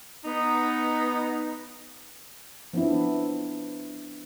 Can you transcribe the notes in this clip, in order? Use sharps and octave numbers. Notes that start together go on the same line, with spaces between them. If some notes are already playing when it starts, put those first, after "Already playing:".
B3 D#4
F3 B3 C4 D4 E4